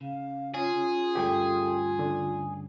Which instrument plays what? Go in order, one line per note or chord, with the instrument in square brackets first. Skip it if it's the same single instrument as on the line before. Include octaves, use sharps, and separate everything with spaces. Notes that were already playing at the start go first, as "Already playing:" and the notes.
[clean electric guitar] C#3 [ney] F5
[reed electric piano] C#4 [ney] F4 [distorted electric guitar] G#4
[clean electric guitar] D2 G2 C#4 [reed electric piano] G4 A4 G5
[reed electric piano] D3